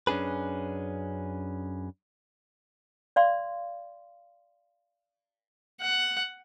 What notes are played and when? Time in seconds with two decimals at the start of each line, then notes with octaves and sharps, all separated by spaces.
0.07 F#2 C#4 D4 G#4 B4
3.16 D5 F5 C6
5.81 F#5